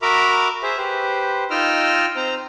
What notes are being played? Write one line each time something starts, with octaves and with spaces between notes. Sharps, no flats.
F#4 A#4 E5 A#5 B5 D6
G#4 C5 E5
G4 B4 C5
D#4 F4 D#5 G5 E6 F6
C4 C5 A#5